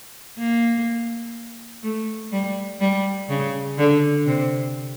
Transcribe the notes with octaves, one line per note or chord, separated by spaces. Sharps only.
A#3
A3
G3
G3
C#3
D3
C3